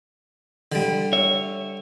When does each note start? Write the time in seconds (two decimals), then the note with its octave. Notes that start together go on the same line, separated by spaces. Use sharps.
0.72 D3 G3
1.13 C#5 E5